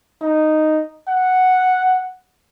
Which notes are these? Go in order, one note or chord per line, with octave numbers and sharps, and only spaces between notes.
D#4
F#5